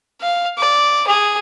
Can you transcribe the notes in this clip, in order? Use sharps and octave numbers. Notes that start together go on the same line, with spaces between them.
F5
D5
G#4